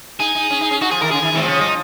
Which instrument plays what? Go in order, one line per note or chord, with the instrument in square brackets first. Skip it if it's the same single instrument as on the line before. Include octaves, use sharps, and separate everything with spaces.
[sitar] D#4 [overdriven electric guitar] G#4
[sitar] D#4
C#4
D#4
C#4
[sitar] D#4 [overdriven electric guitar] F#4
[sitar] F3 [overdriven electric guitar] G#4
[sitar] D#3 [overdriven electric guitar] A#4
[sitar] C#3 [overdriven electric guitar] G#4
[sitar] D#3
D#3
[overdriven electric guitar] C4
[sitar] F3
[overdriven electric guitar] C#4
D#4